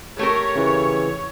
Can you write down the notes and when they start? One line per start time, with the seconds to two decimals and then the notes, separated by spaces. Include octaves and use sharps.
0.19 A3 G4 A#4 C#5
0.56 C#3 E3